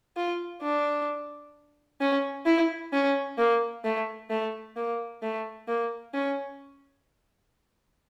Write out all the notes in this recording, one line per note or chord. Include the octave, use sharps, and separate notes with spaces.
F4
D4
C#4
E4
C#4
A#3
A3
A3
A#3
A3
A#3
C#4